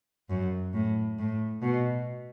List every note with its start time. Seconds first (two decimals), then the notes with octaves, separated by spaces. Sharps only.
0.30 F#2
0.74 A2
1.19 A2
1.62 B2